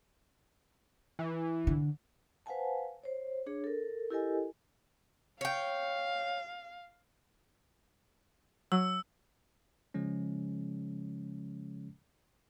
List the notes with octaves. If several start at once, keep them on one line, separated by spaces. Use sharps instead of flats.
E3
D3
B4 C5 F5 F#5 G#5 A5
C5 C#5
D4 G#4 C#5
A4 A#4
E4 G4 A4 A#4 D#5 G#5
C#5 F5 G5
F#3 E6
C#3 F3 G#3 C#4